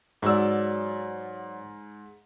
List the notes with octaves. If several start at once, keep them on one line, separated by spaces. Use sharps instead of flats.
G#2 F#3 D5 E6